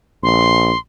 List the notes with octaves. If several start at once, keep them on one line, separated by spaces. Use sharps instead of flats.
A#1 C6